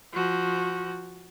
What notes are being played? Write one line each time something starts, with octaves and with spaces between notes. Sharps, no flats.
F3 F#4